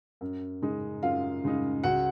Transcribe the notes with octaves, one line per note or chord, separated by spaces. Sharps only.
F#2
C#3 G#3 D#4
F#2 F4 F5
C#3 G#3 D#4
C#2 F#4 F#5